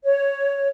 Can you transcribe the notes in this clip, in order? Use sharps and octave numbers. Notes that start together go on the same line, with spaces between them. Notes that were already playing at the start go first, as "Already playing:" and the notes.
C#5